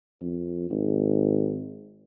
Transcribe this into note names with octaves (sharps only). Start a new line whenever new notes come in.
F2
G#1